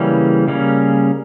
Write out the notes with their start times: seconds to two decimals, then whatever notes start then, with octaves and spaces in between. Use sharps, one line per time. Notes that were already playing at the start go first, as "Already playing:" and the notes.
Already playing: C#3 E3 G3 A#3 C#4
0.48 C#3 G3 A#3 C#4